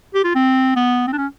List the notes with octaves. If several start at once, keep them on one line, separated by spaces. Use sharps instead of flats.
G4
F4
C4
B3
C4
D4
C#4